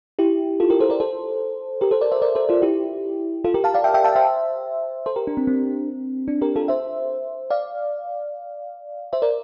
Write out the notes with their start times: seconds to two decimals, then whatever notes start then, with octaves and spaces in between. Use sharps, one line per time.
0.19 E4 G4
0.60 F4 A4
0.70 G4 A#4
0.80 A4 C5
0.90 A#4 D5
1.00 A4 C5
1.81 G4 A#4
1.91 A4 C5
2.01 A#4 D5
2.11 C5 E5
2.22 A#4 D5
2.35 A4 C5
2.49 F4 A4
2.62 E4 G4
3.44 F4 A4
3.54 G4 A#4
3.64 F5 A5
3.74 D5 F5
3.84 E5 G5
3.94 E5 G5
4.04 F5 A5
4.15 C5 E5
5.06 A4 C5
5.16 G4 A#4
5.27 D4
5.37 C4
5.47 C4
6.28 D4
6.41 G4 A#4
6.56 F4 A4
6.68 C5 E5
7.50 D5 F5
9.13 C5 E5
9.22 A#4 D5